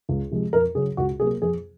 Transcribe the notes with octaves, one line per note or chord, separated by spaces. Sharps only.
C#2
C3 F3 G#3
F2 A#4
C#3 F#3 G#4
C#2 F#4
C3 F#3 A#3 G#4
F2 G#4